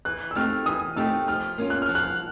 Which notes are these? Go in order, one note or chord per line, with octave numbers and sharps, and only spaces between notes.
E3 F#6
E6
A3 C4 D#4 G4 F6
E3 D#6
A3 C4 D#4 G4 E6
F3 F6
A#3 C#4 F4
F#6
F6
F3
F#6